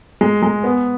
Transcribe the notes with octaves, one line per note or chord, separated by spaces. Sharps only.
G#3
G#3
B3